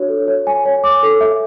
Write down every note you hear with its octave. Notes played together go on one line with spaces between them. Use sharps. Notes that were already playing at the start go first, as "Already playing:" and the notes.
Already playing: D4 F#4 C#5
A4
C#5
G#5
C#5
D6
A4
E5